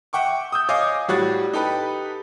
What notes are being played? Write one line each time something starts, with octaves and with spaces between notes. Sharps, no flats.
E5 F#5 G5 C#6 D6
D#6 E6 G6
C#5 D#5 F5 G#5 D6 D#6
A2 G3 F#4 C#5 F#6 A6
D#4 G4 A4 B4 B5